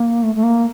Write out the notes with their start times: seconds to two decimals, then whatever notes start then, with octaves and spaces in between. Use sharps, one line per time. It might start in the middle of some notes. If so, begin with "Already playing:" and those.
Already playing: A#3
0.23 A3
0.35 A3
0.43 A#3